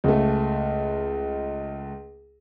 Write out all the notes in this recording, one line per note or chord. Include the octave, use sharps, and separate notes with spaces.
C#2 A3